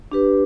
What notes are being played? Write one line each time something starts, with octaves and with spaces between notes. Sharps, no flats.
D4 G4 B4